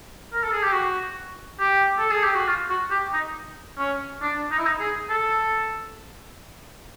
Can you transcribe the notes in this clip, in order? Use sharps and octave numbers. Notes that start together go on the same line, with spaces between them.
A#4
A4
G#4
G4
F#4
G4
A4
G#4
G4
F#4
F4
F#4
G4
D#4
C#4
D4
D#4
E4
D#4
G#4
A4